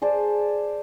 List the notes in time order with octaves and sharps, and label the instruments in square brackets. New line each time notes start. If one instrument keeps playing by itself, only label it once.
[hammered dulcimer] G#4 C5 D5 A5